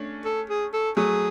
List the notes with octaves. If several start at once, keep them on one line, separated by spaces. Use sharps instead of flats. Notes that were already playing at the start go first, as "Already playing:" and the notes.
Already playing: A3 C#4 D4
A4
G#4
A4
F#3 A3 G#4